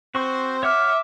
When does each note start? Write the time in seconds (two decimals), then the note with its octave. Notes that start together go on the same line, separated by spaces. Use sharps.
0.15 C4 F#4 C5 C#6
0.63 C#5 E5 F#5 D6 F6